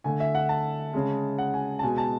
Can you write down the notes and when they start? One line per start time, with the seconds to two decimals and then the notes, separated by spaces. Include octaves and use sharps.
0.04 D3 A3 G#5
0.20 E5
0.35 F#5
0.49 A5
0.93 C#3 G#3
1.38 F#5
1.54 G#5
1.79 A5
1.83 B2 G#3 G#5
1.98 A5